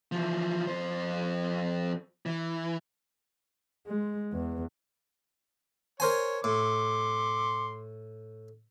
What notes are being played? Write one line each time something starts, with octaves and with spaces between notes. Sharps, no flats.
E3 F3
F2 C5
E3
G#3
E2
A#4 C5 C#5 G#5
A2 C6 D6